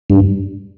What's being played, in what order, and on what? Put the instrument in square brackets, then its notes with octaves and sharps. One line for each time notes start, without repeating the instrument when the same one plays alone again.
[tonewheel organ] G2